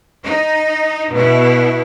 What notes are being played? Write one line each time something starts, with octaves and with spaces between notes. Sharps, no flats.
D#4
B2 E4